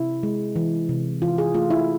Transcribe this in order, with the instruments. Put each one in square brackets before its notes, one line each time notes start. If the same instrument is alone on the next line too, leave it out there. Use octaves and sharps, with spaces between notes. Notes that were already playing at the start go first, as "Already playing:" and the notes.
Already playing: [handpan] C3 E4
G#3
E3
C3
E3 F4
G#4
A3 F4
E4